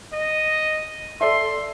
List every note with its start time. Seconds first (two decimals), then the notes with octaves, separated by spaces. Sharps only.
0.13 D#5
1.21 A4 D5 E5 C6